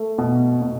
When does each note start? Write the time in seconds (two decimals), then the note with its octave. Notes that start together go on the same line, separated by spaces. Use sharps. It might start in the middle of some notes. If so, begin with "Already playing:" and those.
Already playing: A3
0.18 B2
0.62 B2